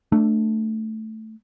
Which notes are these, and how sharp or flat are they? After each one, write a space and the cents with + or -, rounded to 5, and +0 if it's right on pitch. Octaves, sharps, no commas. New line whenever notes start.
A3 +0 D4 +10